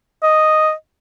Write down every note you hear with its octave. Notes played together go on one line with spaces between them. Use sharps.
D#5